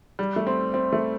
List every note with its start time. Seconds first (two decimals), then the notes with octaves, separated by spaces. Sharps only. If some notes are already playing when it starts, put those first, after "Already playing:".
0.19 G3
0.36 A3
0.47 C4
0.74 C4
0.93 A3